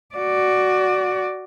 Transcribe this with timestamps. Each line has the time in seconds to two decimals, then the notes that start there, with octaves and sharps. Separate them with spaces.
0.15 F#4 D5